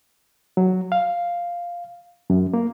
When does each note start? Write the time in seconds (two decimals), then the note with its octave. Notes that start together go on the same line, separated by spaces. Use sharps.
0.57 F#3
0.92 F5
2.30 F#2
2.54 A#3